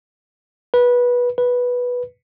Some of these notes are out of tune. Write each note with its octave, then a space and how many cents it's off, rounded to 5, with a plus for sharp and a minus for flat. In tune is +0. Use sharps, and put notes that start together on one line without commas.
B4 -15
B4 -5